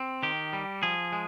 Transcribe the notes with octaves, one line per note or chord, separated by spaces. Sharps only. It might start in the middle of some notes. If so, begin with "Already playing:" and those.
Already playing: C4
D#3 G4
G3
F3 G#4
G#3